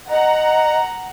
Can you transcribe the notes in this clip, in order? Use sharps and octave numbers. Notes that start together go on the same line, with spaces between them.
D#5 F#5 A#5